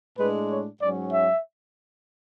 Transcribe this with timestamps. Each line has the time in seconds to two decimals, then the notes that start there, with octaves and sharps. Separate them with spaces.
0.18 A2 G#3 D4 B4
0.49 C#5
0.81 G#2 F#3 C#4 D5
1.12 E5